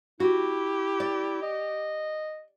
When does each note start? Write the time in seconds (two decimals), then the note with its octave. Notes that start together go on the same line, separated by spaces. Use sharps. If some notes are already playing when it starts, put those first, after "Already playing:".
0.20 E4 F#4 G4
1.00 D5
1.43 D#5